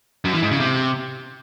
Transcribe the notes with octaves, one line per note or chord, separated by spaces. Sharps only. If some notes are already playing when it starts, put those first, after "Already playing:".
F#2
E3
G#2
C#3
C3